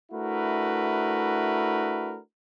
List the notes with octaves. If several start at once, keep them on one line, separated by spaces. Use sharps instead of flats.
A3 D4 E4 F#4 A#4 B4